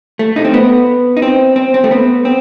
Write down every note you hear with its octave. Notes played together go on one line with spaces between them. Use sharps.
A3
D#4
C4
B3
D#4
C4
C4
C4
A3
B3
C4